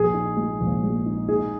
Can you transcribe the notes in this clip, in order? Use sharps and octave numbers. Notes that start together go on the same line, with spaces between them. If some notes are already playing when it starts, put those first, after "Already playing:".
Already playing: A#1 G#4
D#4
G#3
A#1
G#3
D#4
D#4 G#4